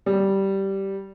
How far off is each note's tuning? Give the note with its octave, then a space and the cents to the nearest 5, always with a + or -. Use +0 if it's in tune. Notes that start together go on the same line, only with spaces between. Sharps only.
G3 -10